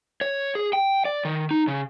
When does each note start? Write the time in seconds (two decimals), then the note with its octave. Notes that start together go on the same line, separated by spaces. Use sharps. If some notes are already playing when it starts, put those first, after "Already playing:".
0.21 C#5
0.55 G#4
0.73 G5
1.05 D5
1.25 D#3
1.51 D#4
1.68 C#3